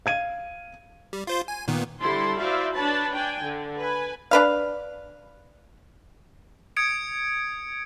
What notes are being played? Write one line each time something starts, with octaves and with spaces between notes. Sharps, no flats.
F5 G#6 D#7
G3
F4 C5 C6
G#5
A#2 D#3 B3
D3 G3 E4 A4 C5 C6
E4 F#4 C5 D5 E5 F5
D4 B4 C#5 A5 B5
D4 G5 G#5
D3
B4 G#5
D4 B4 F5
D#6 G#6 C#7 D7